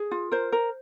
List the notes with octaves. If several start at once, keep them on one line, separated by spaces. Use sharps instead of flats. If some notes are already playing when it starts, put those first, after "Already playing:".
Already playing: G#4
F4
A#4 C5
A#4